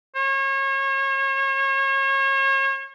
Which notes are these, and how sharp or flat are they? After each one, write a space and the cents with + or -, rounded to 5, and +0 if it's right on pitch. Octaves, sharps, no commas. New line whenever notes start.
C#5 -35